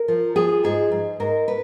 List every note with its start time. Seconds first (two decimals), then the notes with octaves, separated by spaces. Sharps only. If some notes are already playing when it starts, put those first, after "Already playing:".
Already playing: A#4
0.08 F3
0.36 F3 G#4
0.64 G#2 G#4
0.92 G#2
1.20 G#2 A#4
1.48 B4